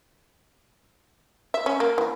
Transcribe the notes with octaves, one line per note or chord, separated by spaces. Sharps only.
E5
C#4
A#3
E3